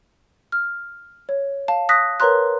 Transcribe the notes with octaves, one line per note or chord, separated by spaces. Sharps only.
F6
C#5
F5 A5
D#6 F#6 A#6 B6
A#4 B4 C#5 A#5 C6 F#6